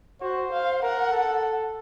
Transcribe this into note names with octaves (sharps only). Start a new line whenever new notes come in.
F#4 C5
F5
A#4 F#5
A4